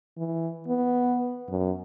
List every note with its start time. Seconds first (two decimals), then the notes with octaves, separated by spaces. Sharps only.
0.17 E3
0.68 B3
1.49 F#2